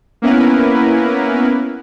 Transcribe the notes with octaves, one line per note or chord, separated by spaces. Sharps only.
A#3 B3 C#4 E4 A#4 B4